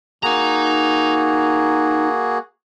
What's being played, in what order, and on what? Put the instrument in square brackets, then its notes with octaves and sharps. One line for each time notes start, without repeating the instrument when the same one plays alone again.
[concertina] A#3 F#4 G#4 [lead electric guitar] D#4 A#5